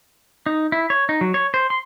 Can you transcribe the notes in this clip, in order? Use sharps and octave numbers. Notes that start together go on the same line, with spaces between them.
D#4
E4
C#5
D#4
F#3
C#5
C5
C6